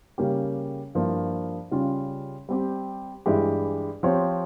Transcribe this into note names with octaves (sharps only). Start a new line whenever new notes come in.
C#3 G3 A#3 C#4 G4
G2 F3 A#3 E4
C#3 G3 C#4 F4
G3 C4 G4
G2 E3 G#3 E4 G4
F3 C4 G4 C#5